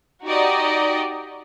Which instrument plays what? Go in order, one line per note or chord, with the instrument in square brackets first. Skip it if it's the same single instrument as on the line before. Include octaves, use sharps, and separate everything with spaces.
[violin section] D#4 F#4 G4 D5 D#5